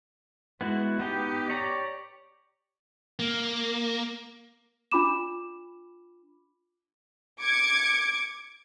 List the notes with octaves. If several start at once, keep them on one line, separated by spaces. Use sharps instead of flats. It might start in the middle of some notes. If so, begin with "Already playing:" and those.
G#3 B3 E4 F#4
B3 D#4 G4 G5
C#5 D5 A#5
A#3
D4 F4 B5 D6 E7
D6 G#6 C#7